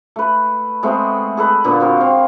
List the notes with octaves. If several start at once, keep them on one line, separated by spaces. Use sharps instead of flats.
A3 B4
G#3 A3 B3 C4
G#4 A4 B4 D#5
A#2 D3 A#3 B3
C4 F#4 A#4
C4 F5